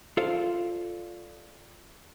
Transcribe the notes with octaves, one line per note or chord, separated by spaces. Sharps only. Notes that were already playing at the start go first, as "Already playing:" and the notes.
F4 A4 C5 D5 F5